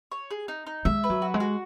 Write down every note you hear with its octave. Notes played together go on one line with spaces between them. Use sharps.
C#5
G#4
D#4
D#4
G#3 E5
B4
F#3
F#4
G#3
F#4